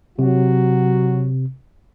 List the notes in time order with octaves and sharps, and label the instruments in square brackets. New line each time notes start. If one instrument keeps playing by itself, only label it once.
[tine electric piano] C3 [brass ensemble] F#3 F#4